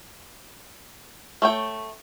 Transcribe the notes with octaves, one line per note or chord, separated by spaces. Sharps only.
A3 C#5 G5